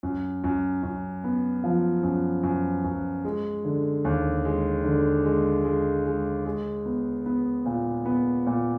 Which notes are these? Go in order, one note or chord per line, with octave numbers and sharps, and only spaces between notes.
F#2
F#2
F#2
B3
F3
F#2
F#2
F#2
G#3
D3
D#2
G#3
D3
G#3
G#3
G#3
G#3
B3
B3
A#2
B3
A#2